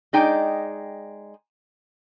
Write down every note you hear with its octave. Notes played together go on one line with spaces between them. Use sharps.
G#3 D#4 D5 G5